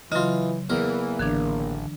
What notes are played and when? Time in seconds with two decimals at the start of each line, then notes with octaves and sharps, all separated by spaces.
0.12 C#3 E3 F#3 D#4 F4
0.70 E2 E3 A#3 A#4
1.19 A1 D3 E3 D4